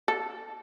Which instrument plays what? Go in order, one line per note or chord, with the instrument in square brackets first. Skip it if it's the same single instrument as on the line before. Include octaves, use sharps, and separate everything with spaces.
[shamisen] A4